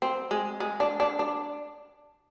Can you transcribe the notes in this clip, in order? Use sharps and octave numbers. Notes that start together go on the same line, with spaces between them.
C4
G#3
G#3
D4
D4
D4